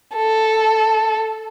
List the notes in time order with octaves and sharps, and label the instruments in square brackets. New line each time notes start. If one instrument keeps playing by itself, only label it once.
[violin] A4